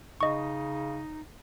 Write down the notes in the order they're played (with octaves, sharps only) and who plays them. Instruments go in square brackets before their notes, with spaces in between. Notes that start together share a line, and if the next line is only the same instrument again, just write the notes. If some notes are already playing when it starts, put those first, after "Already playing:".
[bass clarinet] C#3 [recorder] D#4 [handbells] D#5 C#6